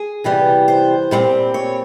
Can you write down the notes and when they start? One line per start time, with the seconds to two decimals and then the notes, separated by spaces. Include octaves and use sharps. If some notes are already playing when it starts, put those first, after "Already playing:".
Already playing: G#4
0.24 C3 E3 G3 B3
0.68 C5
1.11 A#2 G3 C4
1.54 C#5